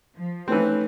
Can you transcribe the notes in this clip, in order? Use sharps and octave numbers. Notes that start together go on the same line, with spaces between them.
F3
E3 A3 C4 C#4 D#4 B4